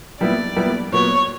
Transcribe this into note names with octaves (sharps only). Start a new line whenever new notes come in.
A#2 G3 B3 E4 D5
A#2 G3 B3 E4
A#2 F#3 B3 C#5